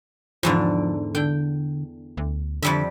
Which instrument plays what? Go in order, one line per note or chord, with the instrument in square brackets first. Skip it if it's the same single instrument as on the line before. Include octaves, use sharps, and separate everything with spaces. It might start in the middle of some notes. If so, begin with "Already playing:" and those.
[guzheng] E2 G#2 D3 [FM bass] F3
[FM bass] D3 [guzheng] G5
[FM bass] D2
[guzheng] F2 G3 E5 [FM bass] D3